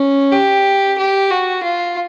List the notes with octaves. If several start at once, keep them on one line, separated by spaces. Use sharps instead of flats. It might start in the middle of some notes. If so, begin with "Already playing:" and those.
Already playing: C#4
G4
G4
F#4
F4